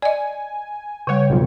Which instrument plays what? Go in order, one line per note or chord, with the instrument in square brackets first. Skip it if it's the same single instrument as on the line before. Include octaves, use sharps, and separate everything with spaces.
[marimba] D5 D#5 [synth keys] G#5
[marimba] C#3 G3 [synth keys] C#5 G5
[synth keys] B1 F2